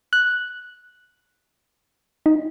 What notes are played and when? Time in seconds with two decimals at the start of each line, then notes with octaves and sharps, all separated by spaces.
0.13 F#6
2.26 D#4